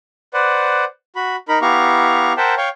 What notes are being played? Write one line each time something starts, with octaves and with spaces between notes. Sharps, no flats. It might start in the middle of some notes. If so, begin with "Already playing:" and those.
B4 C5 D5 F#5
F#4 B5
D#4 A#4 B5
B3 E4 G4 F5 A#5 C#6
A#4 C5 E5 F#5 G5 A5
C#5 F5 G5 C#6